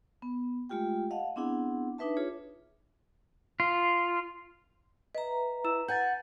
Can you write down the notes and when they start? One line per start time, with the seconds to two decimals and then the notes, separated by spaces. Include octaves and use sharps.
0.22 B3
0.69 G#3 A3 F4 G4 G5
1.11 D#5 F5 F#5 A5
1.36 B3 C4 D4 E4 G#4 F#5
1.98 D4 D#4 B4 E5 A5
2.17 F4 G#4 C#5
3.60 F4
5.15 B4 D#5 E5 A#5
5.64 E4 E6 E7
5.88 F#5 G#5 G6 A6